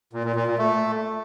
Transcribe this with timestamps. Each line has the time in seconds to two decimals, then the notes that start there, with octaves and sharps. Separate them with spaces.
0.13 A#2
0.24 A#2
0.36 A#2
0.47 A#2
0.58 A3